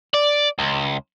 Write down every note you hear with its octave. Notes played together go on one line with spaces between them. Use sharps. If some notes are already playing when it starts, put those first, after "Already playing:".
D5
C#2